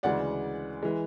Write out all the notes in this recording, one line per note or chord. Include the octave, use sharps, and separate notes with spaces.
D2 C#3 E3 G#3 D5 F#5
E3 G#3